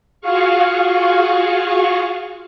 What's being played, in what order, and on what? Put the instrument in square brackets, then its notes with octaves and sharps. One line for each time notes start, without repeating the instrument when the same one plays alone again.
[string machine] F4 F#4 G#4 F5 C#6